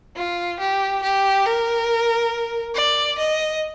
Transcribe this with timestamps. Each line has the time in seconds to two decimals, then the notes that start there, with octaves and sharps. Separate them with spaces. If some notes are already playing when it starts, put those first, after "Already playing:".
0.16 F4
0.60 G4
1.03 G4
1.46 A#4
2.75 D5
3.19 D#5